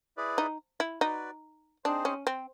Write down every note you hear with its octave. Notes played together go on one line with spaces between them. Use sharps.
E4 G#4 B4 D5
D#4
E4
D#4 F#4 B4 D5
C4 D4 D#4 G#4 C5
C#4
C4